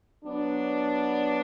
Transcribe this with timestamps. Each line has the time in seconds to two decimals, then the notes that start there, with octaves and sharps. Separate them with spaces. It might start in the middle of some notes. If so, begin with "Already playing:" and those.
0.25 F#3 B3 D4